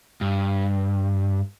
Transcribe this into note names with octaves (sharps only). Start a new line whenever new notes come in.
G2